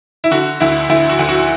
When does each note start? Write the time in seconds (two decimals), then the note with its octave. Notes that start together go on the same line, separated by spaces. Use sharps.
0.24 E4
0.31 D3 F#4
0.60 D2 E4
0.89 D2 E4
1.09 F#4
1.19 D2
1.29 F#4